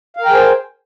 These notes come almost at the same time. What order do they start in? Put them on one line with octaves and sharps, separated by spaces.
F5 A#4 G5 G#4 C5